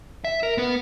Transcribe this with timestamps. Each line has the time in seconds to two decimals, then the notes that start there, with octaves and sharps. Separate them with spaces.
0.25 E5
0.43 A#4
0.58 B3 B4